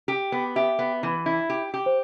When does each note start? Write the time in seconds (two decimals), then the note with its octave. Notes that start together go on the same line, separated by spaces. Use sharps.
0.08 G4
0.32 B3
0.56 G4 E5
0.79 B3
1.03 E3
1.26 E4
1.50 G4
1.74 G4
1.86 C5